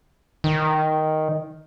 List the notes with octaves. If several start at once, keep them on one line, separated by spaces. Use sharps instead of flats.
D#3